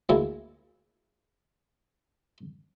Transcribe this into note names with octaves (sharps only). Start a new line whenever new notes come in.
D2 G#3 A#3 E4 E5